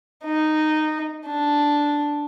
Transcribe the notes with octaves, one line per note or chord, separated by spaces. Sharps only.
D#4
D4